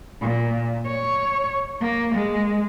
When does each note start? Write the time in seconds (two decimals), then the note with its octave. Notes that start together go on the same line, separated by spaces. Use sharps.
0.21 A#2
0.86 C#5
1.81 A#3
2.14 G#3